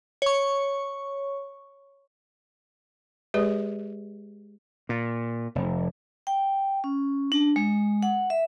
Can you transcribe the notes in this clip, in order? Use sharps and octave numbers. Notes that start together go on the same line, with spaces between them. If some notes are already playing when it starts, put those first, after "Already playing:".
C#5 C#6
G#3 G4 G#4 B4 D5
A#2
F1
G5
C#4
D4
G#3
F#5
E5